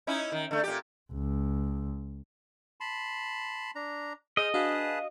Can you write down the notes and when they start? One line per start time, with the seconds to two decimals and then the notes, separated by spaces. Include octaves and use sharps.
0.07 C#4 D#4 E4
0.32 D#3
0.51 D3 A3
0.64 A#2 G4
1.13 C#2
2.80 A5 B5 C6
3.75 D4 A#5
4.37 G#4 C5 D#5 D#6 F6
4.54 D4 F#4 G#4 B4 F5 A5